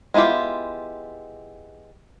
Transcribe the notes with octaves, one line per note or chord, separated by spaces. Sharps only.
G#3 B3 E4 F4 G4